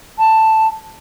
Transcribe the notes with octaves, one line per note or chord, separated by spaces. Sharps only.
A5